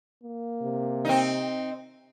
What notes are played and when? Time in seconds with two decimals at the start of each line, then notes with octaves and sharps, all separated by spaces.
0.23 A#3
0.62 C3
1.05 C4 D#4